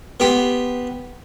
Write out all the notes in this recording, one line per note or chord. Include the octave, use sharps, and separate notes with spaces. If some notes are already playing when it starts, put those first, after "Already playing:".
B3 G4 C6